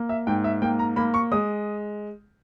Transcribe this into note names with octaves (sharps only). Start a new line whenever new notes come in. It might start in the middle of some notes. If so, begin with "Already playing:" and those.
Already playing: A#3
E5
G#2 G5
E5
A#3 G5
A#5
A#3 B5
C#6
G#3 D#6